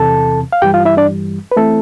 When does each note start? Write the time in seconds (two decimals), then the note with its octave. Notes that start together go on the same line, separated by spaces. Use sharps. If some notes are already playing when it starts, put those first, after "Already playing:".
Already playing: E2 C3 E3 A4 A5
0.52 F5
0.62 G2 E3 G3 G4 G5
0.74 F4 F5
0.85 E4 E5
0.97 D4 D5
1.52 B4
1.57 E3 A3 C4 E4 A4